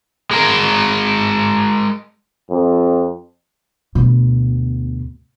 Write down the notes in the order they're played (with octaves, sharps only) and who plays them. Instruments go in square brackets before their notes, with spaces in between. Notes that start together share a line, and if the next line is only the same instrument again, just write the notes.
[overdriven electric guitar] G#3 A#4
[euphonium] F2
[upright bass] D2 B2